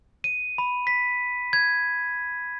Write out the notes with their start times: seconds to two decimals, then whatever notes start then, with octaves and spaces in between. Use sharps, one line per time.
0.24 D#7
0.58 B5
0.87 B6
1.53 G#6